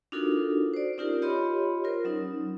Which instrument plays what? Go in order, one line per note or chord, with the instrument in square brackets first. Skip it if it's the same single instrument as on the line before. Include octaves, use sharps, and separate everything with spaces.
[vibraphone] D4 D#4 F4 F#4 A4 A#4
C5 D5
C#4 D#4 F4 G4 A#4
F4 G4 C#5 D#5 B5 C6
F4 A#4 C5
F#3 C#4 D#4